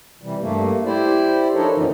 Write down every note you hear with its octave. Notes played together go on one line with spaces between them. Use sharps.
C3 E3 G3
G2 A3 A#3
E4 G4 C5 D5
F3 D4 D#4 A4 A#4 C#5
F#2 A#2 D3 E3 F3 D#4